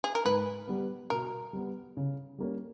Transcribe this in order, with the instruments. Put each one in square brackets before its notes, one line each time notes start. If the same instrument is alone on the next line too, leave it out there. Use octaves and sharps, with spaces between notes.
[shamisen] G#4
A#4
[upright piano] G#2 [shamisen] B4
[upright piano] G3 B3
[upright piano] B2 [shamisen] A#4
[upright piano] G3 B3
C#3
G3 A#3 C#4